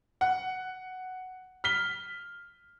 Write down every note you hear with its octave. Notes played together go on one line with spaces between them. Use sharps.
F#5
F6 B6 G7